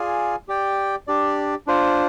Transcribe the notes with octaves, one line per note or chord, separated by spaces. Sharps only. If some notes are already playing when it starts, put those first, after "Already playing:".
Already playing: F4 G#4 D5 F5 G#5
G4 D5 G5
D4 G4 D5
D4 F4 C5